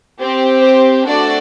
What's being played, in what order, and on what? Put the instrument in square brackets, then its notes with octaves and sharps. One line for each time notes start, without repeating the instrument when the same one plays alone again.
[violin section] C4 G4
C5
A3 D4 F#4 A4 D5